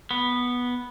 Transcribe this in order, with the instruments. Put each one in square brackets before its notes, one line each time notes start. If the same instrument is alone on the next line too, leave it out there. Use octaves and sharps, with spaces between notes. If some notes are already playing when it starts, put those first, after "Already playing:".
[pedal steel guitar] B3